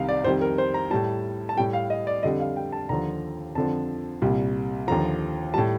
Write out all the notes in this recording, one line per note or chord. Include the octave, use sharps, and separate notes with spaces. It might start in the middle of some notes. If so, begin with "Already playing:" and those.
Already playing: C2 C3 D#3 G3 F5
D5
F2 D#3 G3 C5
A#4
C5
A#5
A2 G3 A5
A5
A2 G3 G5
F5
D#5
D5
F2 D3 G3 D#5
F5
G5
A5
D#2 D3 F3 A#5
F2 D3 F3 A5
C2 A#2 G3
D#2 D3 F3 A#5
A2 G3 A5